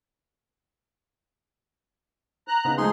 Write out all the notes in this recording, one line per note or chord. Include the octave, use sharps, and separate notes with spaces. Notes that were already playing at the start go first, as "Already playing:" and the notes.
A#5 F#6
C#3 B3 D#4
F3 G#3 A3 D#4 G#4 C6